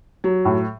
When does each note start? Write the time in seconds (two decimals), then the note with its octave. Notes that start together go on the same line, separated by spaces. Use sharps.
0.24 F#3
0.45 A2